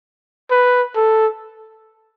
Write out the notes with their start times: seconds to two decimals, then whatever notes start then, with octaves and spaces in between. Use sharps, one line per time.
0.51 B4
0.96 A4